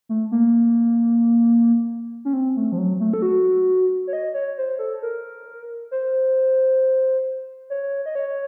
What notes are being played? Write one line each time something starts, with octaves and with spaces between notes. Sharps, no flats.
A3
A#3
C#4
C4
A3
F3
F#3
A3
A4
F#4
C#5
D#5
C#5
C5
A4
A#4
C5
C#5
D#5
C#5